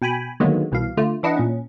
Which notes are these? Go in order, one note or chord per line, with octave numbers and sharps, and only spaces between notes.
B2 G5 G#5 B5
D3 D#3 F#3 G#3 A#3 B3
C2 B2 E3 F5
D3 A3 F4
E3 D4 E4 D#5 F#5
A#2 C#4